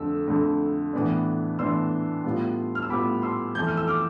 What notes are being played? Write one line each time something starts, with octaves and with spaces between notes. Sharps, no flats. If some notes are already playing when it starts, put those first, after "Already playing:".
Already playing: F2 D3 A3 E6
F2 D3 A3
A2 E3 B3 D4
A2 E3 B3 D4 C6 E6
A2 G3 B3 F4
F6
E6
A2 G3 B3 F4 B5 D6
C6 E6
F2 E3 A3 G6
F6
E6
D6 F6